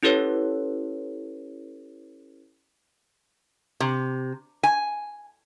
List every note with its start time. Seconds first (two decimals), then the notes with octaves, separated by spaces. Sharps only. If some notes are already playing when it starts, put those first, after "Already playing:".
0.03 C#4 E4 G4 A4 B4 C#5
3.80 C3
4.63 G#5